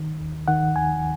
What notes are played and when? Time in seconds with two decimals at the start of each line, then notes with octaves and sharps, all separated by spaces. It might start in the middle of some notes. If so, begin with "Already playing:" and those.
Already playing: D#3
0.21 D#2
0.48 D#3 F#5
0.75 D#2 G#5